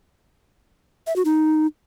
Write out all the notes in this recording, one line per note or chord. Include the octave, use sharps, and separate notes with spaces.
E5
F#4
D#4